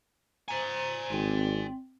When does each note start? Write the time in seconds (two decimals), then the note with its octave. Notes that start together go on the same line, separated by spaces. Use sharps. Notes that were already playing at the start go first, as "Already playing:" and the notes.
0.49 C5 D5 G#5 A#5
1.11 G#1 C4 G5